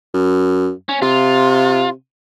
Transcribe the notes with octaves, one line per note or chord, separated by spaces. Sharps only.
F#2
C#4
C3 F4